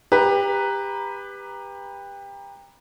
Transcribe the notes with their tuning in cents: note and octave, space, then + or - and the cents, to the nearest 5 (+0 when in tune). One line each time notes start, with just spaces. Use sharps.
G4 +25 B4 +0 A#5 +0